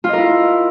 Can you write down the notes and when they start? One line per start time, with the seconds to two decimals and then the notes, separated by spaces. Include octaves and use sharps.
0.04 F4
0.09 D#5
0.13 A#4
0.18 E4